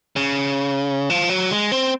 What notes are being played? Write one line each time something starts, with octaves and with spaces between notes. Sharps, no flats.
C#3
F3
F#3
G#3
C4